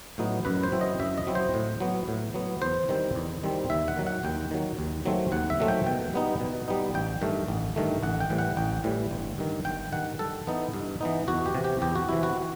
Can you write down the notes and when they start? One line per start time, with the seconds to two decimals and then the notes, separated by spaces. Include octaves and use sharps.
0.18 A2 F#3 B3 D#4
0.45 F#2 B4
0.63 C5
0.72 F#3 C4 E4
0.81 D#5
1.00 F#2 E5
1.18 D#5
1.27 F#3 C4 E4
1.35 C5
1.54 A2
1.80 F#3 B3
2.08 A2
2.34 F#3 B3
2.62 E2 C5
2.89 D#3 G3 C4
3.15 E2
3.43 D#3 G3 C4
3.70 D#2 E5
3.88 F#5
3.96 D#3 F#3
4.07 F#5
4.23 D#2 G5
4.51 D#3 F#3
4.79 D#2
5.06 D#3 F#3 A3 C4
5.32 D#2 F#5
5.50 E5
5.60 D#3 F#3 A3 C4
5.68 G5
5.86 B2 G5
6.14 G3 B3 D#4
6.40 B2
6.68 G3 B3 D#4
6.94 A1 G5
7.21 G2 D#3 A3
7.48 A1
7.76 G2 D#3 A3
8.03 A1 F#5
8.20 G5
8.30 A2 E3 G3
8.38 F#5
8.57 A1 G5
8.84 A2 E3 G3
9.11 G1
9.38 G2 D#3
9.65 G1 G5
9.92 G2 D#3 F#5
10.19 G2 A4
10.47 E3 B3 D#4
10.74 G2
11.01 E3 B3 D#4
11.28 E2 F#4
11.46 G4
11.55 C3 E3
11.64 G4
11.82 E2 G4
11.95 F#4
12.09 C3 E3 E4
12.23 F#4